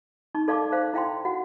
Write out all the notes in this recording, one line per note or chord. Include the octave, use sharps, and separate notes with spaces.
D#4 C#6
A4 D5 F5 A5 C#6 D6
C5 F5
E4 F5 G5 C6
F#4 F#5